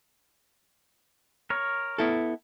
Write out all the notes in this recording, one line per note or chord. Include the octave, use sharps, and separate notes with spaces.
A#4 C#5
B3 E4 A4